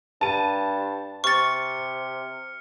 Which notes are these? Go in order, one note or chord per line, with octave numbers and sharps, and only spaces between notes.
G2 A5 D#7
C3 C#6 F6 A6 C#7